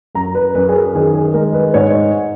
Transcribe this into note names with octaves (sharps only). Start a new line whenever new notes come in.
F#2 A#5
B4
F#2 B4
G#4
A#4
D#3 G#4
G#4
G#3 A#4
B4
G#2 C#5